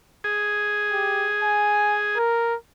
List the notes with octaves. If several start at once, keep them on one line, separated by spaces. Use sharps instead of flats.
G#4
G4
G#5
A#4